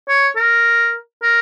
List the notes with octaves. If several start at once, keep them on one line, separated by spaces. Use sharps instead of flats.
C#5
A#4
A#4